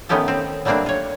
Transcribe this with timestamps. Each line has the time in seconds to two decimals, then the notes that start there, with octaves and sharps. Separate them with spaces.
0.09 D#3 A3 B3 C#4 G4 A4
0.28 C4
0.65 F#3 G3 A3 A#3 C4 D4
0.86 F4 C#5